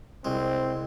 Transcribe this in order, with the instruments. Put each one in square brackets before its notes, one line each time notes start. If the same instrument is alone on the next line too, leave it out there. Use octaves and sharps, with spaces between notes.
[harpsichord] C2 G#3 [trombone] C4